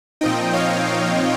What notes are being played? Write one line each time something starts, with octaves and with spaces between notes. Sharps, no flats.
A#2 F3 C4 D#4 D#5 G5
C#5 F5